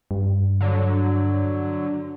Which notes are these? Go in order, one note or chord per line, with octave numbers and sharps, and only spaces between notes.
G2
D3 F#3